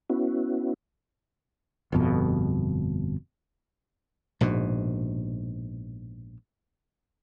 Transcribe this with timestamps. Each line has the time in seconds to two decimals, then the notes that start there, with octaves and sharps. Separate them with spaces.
0.10 B3 C#4 E4 F#4
1.92 G1 F2 B2
4.41 A#1 G#2 B2